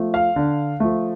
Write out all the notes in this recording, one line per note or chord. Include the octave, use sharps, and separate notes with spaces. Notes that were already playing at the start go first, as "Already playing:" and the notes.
Already playing: F3 A3
F5
D3
F3 A3